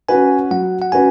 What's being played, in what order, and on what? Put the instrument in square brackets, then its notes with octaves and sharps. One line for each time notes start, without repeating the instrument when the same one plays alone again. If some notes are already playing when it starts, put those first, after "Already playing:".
[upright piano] C#4 F#4 B4 [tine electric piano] G#5
[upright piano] F#3 [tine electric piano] F#5
[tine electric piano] F#5
[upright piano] C#4 F#4 B4 [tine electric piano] G#5